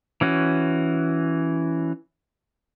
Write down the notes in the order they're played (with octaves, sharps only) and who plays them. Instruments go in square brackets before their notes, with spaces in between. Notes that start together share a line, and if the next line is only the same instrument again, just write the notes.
[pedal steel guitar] E3 C#4 F#4